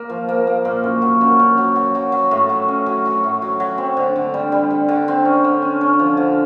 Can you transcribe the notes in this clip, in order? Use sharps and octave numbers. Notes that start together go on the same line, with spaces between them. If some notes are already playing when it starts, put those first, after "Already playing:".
Already playing: A#3
F3
A#3
A#3
A#2
F#2
F#3
F#2
F#2
F#3
F#3
F#3
F#3
A2
F#3
C#4
F#3
F#3
A2
F#3
F#3
C4
D3
D3
G3
G3
G3
D3
C4
C#4
D3
C#4
C#4
F3
D3